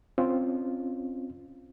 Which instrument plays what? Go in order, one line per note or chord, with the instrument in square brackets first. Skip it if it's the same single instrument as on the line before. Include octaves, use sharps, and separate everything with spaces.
[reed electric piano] C4 C#4 F4